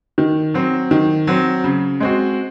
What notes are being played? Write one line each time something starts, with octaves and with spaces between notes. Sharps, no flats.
D#3
F#3 C4
D#3
F#3 C4
C#3
G#3 C4 F#4